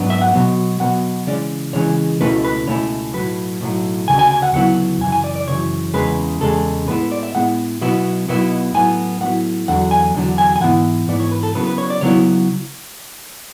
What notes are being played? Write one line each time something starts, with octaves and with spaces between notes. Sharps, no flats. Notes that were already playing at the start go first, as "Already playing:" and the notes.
Already playing: G#2 F#3 B3 D4
E5
F#5
B2 F#3 B3
B2 F#3 B3 F#5
C#3 E3 G#3 C#4 D5
C#3 E3 G#3 C#4 C#5
C#2 B2 A3 C#4 E4 B4
B4
C#2 B2 A3 C#4 E4 C#5
B1 A2 F#3 B4
B1 A2 F#3
D2 C#3 G#5
G#5
G#5
F#5
D2 C#3 F#3 B3 E4 F#5
F#2 C#3 E3 G#5
G#5
D5
D5
F#2 C#3 E3 C#5
E2 C#3 G#3 B4
E2 C#3 G#3 A4
A2 G#3 B3 E4 B4
D5
E5
A2 G#3 B3 E4 F#5
B1 B2 F#3 B3 E4
B1 B2 F#3 B3 E4
A2 F#3 B3 E4 G#5
A2 F#3 B3 E4 F#5
E2 D3 F#3 F#5
G#5
E2 D3 F#3
G#5
G#5
G#2 E3 B3 E4 F#5
G#2 E3 B3 E4 D5
C#5
B4
A4
C#3 F#3 B3 E4 B4
B4
C#5
D5
C#3 F#3 B3 E4 C#5